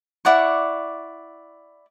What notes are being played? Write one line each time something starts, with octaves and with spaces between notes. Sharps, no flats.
E4 D5 F#5 C#6